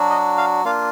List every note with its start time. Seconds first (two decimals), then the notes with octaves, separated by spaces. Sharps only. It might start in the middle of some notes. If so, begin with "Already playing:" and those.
Already playing: F#3 D4 F#4
0.10 D#5
0.37 F5
0.65 A#3 D4 F4 F5